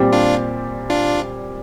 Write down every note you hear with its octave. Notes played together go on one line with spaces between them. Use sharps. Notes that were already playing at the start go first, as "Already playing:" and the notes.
Already playing: A#2 G3 C4 G4 D5
D4 F4
D4 F4